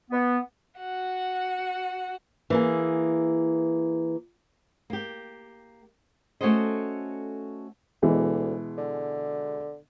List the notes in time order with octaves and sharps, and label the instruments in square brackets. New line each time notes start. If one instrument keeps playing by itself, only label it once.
[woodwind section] B3
[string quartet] F#4 F#5
[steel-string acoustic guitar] E3 A#3 G#4
[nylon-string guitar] A#3 G4
A3 C#4 F#4 A4 C5 D#5
[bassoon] D2 [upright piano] B2 E3 G#3
[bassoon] D3